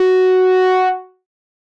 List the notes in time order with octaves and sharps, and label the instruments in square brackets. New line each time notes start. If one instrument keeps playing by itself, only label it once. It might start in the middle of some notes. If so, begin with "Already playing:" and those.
Already playing: [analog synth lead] F#4